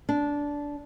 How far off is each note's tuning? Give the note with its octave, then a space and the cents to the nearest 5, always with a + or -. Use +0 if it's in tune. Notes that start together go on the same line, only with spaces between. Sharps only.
D4 -15